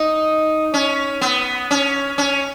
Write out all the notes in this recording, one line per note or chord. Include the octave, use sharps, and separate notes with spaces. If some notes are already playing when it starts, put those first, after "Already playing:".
Already playing: D#4
C#4
B3
C#4
C#4